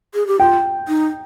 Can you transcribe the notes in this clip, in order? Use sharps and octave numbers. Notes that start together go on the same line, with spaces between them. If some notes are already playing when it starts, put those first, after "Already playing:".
G#4
G4
F4 G5
D#4